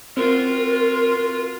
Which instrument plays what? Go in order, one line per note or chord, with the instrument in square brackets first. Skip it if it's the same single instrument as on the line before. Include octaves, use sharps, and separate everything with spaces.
[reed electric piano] C4 [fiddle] F4 F#4 [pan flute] A#4